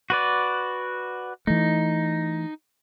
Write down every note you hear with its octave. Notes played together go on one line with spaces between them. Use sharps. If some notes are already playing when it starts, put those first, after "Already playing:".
F#4 B4 D5
E3 A3 D#4